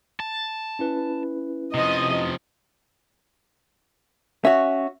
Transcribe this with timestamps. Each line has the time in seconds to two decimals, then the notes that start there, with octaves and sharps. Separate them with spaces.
0.20 A5
0.79 C#4 E4 B4
1.75 C3 F3 D#5
4.45 C#4 F#4 E5